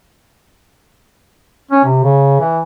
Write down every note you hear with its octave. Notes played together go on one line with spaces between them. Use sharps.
C#4
C3
C#3
E3